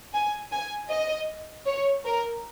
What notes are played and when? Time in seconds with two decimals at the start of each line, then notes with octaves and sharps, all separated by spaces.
0.14 G#5
0.52 G#5
0.90 D#5
1.67 C#5
2.06 A#4